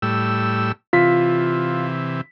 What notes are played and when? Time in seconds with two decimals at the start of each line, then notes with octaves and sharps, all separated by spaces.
0.02 A2 G3 E6
0.93 C3 E3 F4 B6